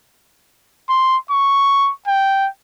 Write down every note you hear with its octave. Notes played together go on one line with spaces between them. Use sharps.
C6
C#6
G5